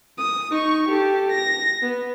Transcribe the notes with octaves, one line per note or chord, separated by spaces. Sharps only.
D#6
D#4 C#6
G4 A4
A#6
B3